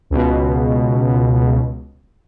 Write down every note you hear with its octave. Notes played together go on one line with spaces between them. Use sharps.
C#2 B2